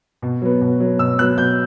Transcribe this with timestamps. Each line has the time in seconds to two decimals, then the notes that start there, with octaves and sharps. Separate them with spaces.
0.22 B2
0.42 F#3 B3
0.61 B2
0.80 F#3 B3
0.99 B2 E6
1.18 F#3 B3 F#6
1.38 B2 G6